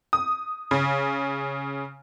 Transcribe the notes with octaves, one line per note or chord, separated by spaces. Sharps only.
D#6
C#3